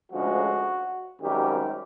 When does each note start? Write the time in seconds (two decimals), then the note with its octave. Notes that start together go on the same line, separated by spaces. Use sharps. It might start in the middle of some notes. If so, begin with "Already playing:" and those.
0.10 D2 C#3 F3 G#3 F#4
1.21 G#1 F#2 D#3 G3 G4